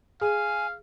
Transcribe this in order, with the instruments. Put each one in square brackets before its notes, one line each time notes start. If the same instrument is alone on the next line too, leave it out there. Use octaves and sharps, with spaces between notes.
[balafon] G#4 [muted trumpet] F5 [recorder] G#5